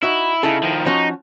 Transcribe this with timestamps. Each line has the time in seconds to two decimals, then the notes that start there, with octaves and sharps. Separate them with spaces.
0.03 D#4 E4 F#4
0.43 C#3 D#4 E4 A4
0.63 D#3 F3
0.86 F3 C#4 D#4 F#4